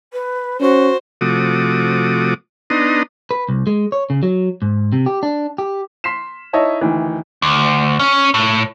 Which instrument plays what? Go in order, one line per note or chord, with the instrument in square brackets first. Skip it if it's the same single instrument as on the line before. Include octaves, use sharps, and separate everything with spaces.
[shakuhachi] B4
[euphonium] C#4 [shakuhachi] F#4 [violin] C5
[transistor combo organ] C3 F3 A3 F#4 D6 D#6
B3 D4 D#4 A#5 C6 D#6
[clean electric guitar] B4
C2
G#3
C#5
C#3
F#3
G#2
C3
G4
D4
G4
[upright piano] C6 B6 C7 E7
D#4 E4 C#5 D#5 E5 A5
D2 D#3 E3
[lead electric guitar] D2
C#4
A2